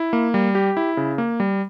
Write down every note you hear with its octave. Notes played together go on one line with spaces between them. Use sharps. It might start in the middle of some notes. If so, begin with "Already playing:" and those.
Already playing: E4
A#3
G3
G4
E4
C#3
A#3
G3